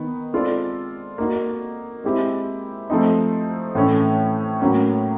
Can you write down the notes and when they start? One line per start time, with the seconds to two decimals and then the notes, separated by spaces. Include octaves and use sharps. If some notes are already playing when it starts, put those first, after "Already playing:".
Already playing: D#3 B3 D#4
0.33 G#3 C4 F4 A4 D5
1.18 A#3 D#4 F#4
2.04 G#3 C4 E4 G4
2.90 F3 A3 C4 D#4
3.75 A2 E3 A3 C#4
4.61 A2 F#3 A#3 C#4